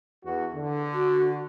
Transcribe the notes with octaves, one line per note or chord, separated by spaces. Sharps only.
E2 F#4
D3
F#4